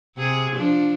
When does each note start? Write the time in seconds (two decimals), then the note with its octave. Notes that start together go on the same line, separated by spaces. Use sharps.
0.17 C3 G#4
0.55 F3 D4